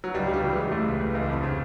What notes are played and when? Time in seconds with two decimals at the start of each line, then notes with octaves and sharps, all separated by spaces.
0.04 F#3
0.14 C#2 G3
0.28 C#3
0.34 G3
0.43 E3
0.53 G#3
0.58 C#2
0.71 C#2 A3
0.86 C#2
1.00 E3
1.15 C#2
1.29 F2
1.44 C#3